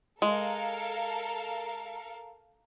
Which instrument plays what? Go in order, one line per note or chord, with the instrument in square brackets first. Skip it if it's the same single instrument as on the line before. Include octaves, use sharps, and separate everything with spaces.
[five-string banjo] G#3 [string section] A4 A#4 F5